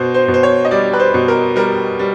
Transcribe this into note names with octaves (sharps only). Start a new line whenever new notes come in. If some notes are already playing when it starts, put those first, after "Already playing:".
Already playing: B2 C5
C5
B2
C5
C#5
D#5
G3 D5
B4
C5
B2
A#4
G3 A#4
G3